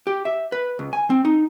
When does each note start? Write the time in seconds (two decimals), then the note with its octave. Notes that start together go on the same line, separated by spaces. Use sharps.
0.07 G4
0.25 E5
0.52 B4
0.79 C#2
0.93 G#5
1.10 C4
1.25 D#4